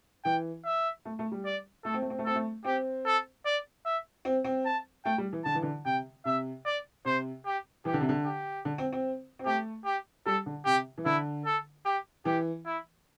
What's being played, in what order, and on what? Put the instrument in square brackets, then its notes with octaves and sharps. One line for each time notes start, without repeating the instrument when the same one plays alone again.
[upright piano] E3 [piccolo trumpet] G5
[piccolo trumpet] E5
[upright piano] A3
A3
G3
[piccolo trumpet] D5
[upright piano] A3 [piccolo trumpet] A4
[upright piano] C4
A3
C4
A3
[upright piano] C4 [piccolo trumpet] A4
[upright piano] A3
[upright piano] C4 [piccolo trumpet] G4
[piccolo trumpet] A4
D5
E5
[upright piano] C4
C4
[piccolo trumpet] A5
[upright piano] A3 [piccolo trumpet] G5
[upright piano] G3
E3
[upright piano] D3 [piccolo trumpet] A5
[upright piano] E3
D3
[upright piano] C3 [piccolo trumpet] G5
[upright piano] C3 [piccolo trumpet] E5
[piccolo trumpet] D5
[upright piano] C3 [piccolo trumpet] C5
[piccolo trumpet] G4
[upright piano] E3 [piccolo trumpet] G4
[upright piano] D3
C3
D3
[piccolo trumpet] G4
[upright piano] D3
C4
C4
C4
[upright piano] A3 [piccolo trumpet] G4
[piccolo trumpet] G4
[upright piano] G3 [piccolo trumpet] A4
[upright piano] D3
[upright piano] C3 [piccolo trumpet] G4
[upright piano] E3
[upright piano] D3 [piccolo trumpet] E4
[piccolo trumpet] A4
G4
[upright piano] E3 [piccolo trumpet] G4
[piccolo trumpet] E4